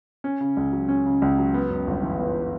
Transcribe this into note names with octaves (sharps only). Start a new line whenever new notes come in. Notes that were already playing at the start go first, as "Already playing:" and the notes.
C#4
C#3
C#2
F#3
C#4
C#3
C#2
F#3
B3
F#2
G1
E3
B3